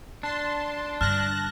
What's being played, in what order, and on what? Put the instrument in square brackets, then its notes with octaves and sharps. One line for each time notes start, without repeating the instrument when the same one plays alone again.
[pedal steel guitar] D4 [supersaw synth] A5 C6
[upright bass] G2 D3 [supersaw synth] A5 F#6 A#6 [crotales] F6